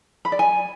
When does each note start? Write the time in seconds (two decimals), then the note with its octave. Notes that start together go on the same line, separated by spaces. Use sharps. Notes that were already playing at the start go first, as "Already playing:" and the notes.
0.25 B5
0.32 D5
0.39 G#5